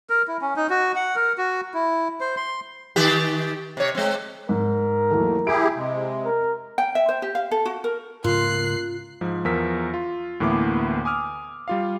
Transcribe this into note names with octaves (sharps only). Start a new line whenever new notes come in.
A#4
E4
C#4
D#4
F#4
F#5
A#4
F#4
E4
C5
C6
D#3 G4
C3 C#5
G#3 C4
G#2 A#4
D#2 E3 F#3 A3
E4 G4 G#4 E5 D7
C3 G#3
A#4
G5
E5
C5
G4
F5
A4
F#4
A#4
G#2 C#3 A#3 F4 A#4 C6 F#6 C7
G#2 F3
E2 F3 A#4 E6 B6
F4
D2 A2 E3 A#3 B3 D6
G#5 D6 D#6 F6
G3 F4 F5